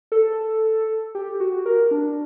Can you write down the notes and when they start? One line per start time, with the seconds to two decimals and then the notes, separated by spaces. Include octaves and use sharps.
0.12 A4
1.15 G4
1.40 F#4
1.66 A#4
1.91 D4